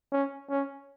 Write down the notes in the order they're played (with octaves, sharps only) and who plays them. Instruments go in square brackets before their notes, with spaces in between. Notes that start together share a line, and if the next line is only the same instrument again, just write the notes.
[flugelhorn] C#4
C#4